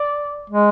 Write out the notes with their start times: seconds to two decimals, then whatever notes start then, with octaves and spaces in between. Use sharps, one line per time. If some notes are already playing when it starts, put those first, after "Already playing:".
Already playing: D5
0.50 G#3